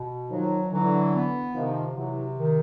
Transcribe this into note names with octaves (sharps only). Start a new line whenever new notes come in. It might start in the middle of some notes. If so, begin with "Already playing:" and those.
Already playing: B2
D#3 F3 F#3
D3 E3 F#3
B3
C3 D#3 F3
C3 E3 F#3
D#3